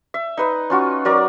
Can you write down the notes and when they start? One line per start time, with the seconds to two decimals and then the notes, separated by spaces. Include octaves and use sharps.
0.14 E5
0.37 D#4 B4 D#5
0.70 C#4 F4 F#4
1.05 F#3 A#4 D5 D6